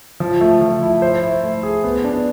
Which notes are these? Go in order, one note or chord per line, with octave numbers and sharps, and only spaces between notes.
F3
A3
F3
E4
C5
E4
A3
G#4
B3
D4